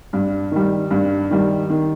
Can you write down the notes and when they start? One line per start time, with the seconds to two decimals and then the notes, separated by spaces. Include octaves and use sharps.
0.13 G2
0.51 D#3 G3
0.91 G2
1.30 D#3 G3
1.70 D#3